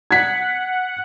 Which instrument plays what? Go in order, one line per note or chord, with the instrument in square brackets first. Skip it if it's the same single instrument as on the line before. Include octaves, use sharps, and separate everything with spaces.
[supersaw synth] F#5 [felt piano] G#6 B6